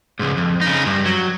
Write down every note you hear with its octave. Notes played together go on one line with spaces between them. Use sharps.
C#2 G#2
F2
C#3 D#4
G2
F#3